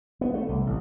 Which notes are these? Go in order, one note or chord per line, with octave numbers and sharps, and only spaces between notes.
B3
A3
C2
A1